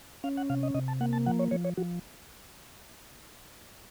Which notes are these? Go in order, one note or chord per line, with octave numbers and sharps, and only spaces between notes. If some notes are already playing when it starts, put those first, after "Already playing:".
C#4 F5
F#5
C3 F5
D#5
C3 D#5
A5
A#3 F#5
A5
F3 F#5
C#5
F3 C#5
C#5
F3 F#4